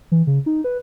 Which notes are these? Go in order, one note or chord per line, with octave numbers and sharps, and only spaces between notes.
E3
C#3
D#4
B4